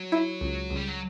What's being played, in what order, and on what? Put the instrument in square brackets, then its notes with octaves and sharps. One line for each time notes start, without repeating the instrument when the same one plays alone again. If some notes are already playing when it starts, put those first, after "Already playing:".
Already playing: [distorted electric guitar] F#3
[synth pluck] E4
C#2
C#2
[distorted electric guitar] G3
F#3